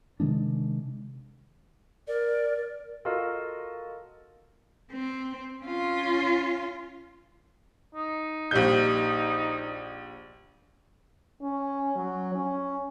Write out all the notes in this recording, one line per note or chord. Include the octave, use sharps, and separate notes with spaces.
C3 D#3 G#3 D4
A#4 D5
F4 F#4 A4 A#4 D#5
C4
C#4 F4
D#4
A#1 G3 G6
C#4
F#3
C#4